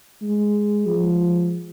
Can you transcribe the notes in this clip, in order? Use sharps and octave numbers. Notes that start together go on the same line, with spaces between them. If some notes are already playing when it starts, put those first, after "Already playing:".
G#3
F3